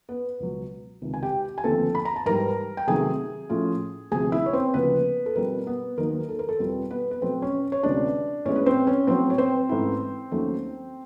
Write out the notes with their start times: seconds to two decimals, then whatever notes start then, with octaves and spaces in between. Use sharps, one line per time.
0.09 B3 B4
0.40 C#2 B2 F#3
1.02 C#2 C3 D#3
1.14 G#5
1.23 G4 G5
1.58 G#5
1.64 D#2 D3 F3 A3 C4 A4 A5
1.95 B5
2.05 A#5
2.16 A5
2.25 G#2 E3 G3 A#4 A#5
2.77 G5
2.87 C3 D#3 F#3 A3 C4 G#4 G#5
3.49 A2 F3 A3 C#4 F4
4.11 D2 C3 F3 G#4 G#5
4.32 E4 E5
4.46 C#5
4.53 C4 C5
4.74 D2 C#3 F3 A#3 B3 B4
5.26 A4
5.35 B2 G3 C4 F4 A#4
5.67 B3 B4
5.97 D#2 D#3 F#3 B3 D#4 A#4
6.29 A4
6.39 A#4
6.49 A4
6.59 E2 B2 G3 C4 F4
6.90 B3 B4
7.11 B4
7.21 B2 F#3 A3 C4 C5
7.42 C#4 C#5
7.72 C#5
7.83 D2 C3 E3 G#3 C#4 D4 D5
8.45 A2 E3 G#3 B3 C#4 C#5
8.56 B4
8.66 C4 C5
8.87 C#4 C#5
9.07 A2 F#3 B3 C4 C5
9.30 C#5
9.38 C4 C5
9.69 G#2 E3 A3 C#4 E4
10.31 D#2 D#3 F#3 A3 C#4